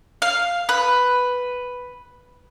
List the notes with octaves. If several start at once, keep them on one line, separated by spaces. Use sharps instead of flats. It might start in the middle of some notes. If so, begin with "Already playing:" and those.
F5
B4